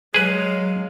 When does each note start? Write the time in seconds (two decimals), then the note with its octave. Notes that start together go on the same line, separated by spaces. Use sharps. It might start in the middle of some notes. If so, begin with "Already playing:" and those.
0.14 F#3 G#3 G#4 B4 F5